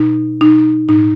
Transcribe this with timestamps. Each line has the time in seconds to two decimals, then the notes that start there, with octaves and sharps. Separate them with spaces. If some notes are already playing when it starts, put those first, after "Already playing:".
Already playing: B2 D#4
0.41 B2 D#4
0.88 A2 D#4